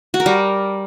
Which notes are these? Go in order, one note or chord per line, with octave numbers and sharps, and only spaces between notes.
F#4
A#4
G3